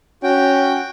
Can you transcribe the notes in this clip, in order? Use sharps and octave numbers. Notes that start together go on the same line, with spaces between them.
C#4 F#4 G5